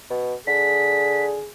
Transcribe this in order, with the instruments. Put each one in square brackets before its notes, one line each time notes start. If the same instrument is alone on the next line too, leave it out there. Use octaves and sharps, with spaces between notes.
[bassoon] B2
[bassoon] D3 [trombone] G#4 [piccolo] B6